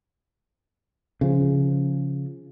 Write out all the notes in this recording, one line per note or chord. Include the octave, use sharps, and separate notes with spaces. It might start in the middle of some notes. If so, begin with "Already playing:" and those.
C#3 F3